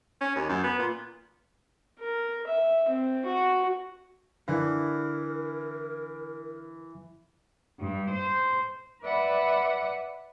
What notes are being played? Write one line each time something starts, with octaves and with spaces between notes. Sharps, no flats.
C#4
D#2
F#2
B3
A#2
A#4
E5
C4
F#4
D3 E3 A#4
G2
C5
B4 D5 E5 F#5 B5